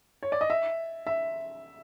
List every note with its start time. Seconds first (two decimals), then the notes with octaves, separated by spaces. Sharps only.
0.23 C#5
0.32 D5
0.41 D#5
0.50 E5
1.07 E5